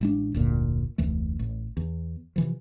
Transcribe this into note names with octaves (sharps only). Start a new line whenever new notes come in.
A1 G#3 D4
F1 D2 A#2
F1 D2 E3 A3
A1
E2
C3 E3 F3